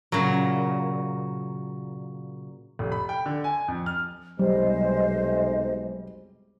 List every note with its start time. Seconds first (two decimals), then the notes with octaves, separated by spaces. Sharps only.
0.12 A#2 C#3 F#3
2.79 F1
2.92 B5
3.09 G5
3.26 D3
3.44 G#5
3.68 F2
3.86 F6
4.39 B1 C3 G3 G#3 C5 D#5